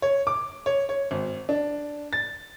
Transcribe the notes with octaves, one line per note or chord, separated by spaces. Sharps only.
C#5
D6
C#5
C#5
G#1
D4
A6